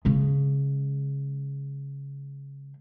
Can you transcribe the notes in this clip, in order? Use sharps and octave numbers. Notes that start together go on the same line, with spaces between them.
C#3 G#3